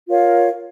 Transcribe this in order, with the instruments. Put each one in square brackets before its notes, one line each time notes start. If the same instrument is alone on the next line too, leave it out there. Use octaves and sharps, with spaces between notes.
[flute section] F4 A#4 C#5 F5